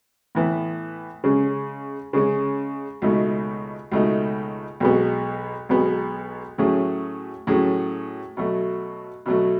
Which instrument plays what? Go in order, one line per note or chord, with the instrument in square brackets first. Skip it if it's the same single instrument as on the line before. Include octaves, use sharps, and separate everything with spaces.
[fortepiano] A2 E3 B3
C#3 G#3 C#4
C#3 G#3 C#4
C#2 B2 A3 D#4
C#2 B2 A3 D#4
B1 B2 G#3 B3
B1 B2 G#3 B3
A2 F#3 A3 C#4 G#4
A2 F#3 A3 C#4 G#4
B2 F#3 A3
B2 F#3 A3